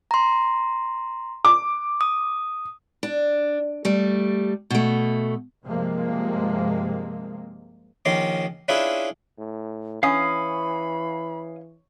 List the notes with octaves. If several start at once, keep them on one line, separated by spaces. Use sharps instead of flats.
A#5 C6
D6
D#6
D4
G3 A3
B2 A3
G2 C3 F3 G#3 A#3
A#1 D#3 C#4 C6 D6
C#4 D4 E4 F4 G#4 B4
A2
E3 C#4 F5 B5 D#6